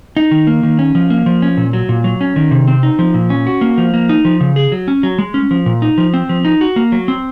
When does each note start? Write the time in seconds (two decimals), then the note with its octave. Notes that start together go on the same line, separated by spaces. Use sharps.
0.17 D#4
0.31 D#3
0.47 A#3
0.63 D#3
0.79 C#4
0.95 F3
1.10 A#3
1.26 F3
1.42 C#4
1.57 A#2
1.73 F#3
1.89 A#2
2.04 F#3
2.21 C#4
2.36 D#3
2.51 C3
2.67 C4
2.83 D#4
2.99 F3
3.14 A#2
3.30 C#4
3.47 F#4
3.61 A#3
3.78 F3
3.94 A#3
4.09 D#4
4.25 F3
4.41 C#3
4.56 G#4
4.72 F#3
4.88 C#4
5.03 F#3
5.18 G#3
5.34 C#4
5.51 F3
5.66 A#2
5.82 D#4
5.98 F3
6.14 C4
6.29 F3
6.45 D#4
6.61 F#4
6.76 A#3
6.92 F#3
7.08 C4